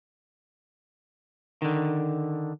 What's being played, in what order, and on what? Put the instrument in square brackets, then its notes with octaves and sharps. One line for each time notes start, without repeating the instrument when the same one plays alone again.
[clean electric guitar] D3 D#3